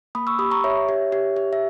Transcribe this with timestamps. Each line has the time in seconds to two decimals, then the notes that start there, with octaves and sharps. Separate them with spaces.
0.15 A#3 B5 D#6
0.27 C#6 E6
0.39 G4 B5 D#6
0.51 A#5 C#6
0.64 G4 C#5 E5
0.89 G4
1.12 G4
1.36 G4
1.53 E5